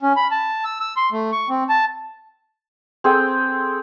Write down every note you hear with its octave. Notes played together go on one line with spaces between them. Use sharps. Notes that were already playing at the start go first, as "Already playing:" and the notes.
C#4
B5
A5
E6
E6
C6
A3
C#6
C4
A5
C4 G#4 A4 G5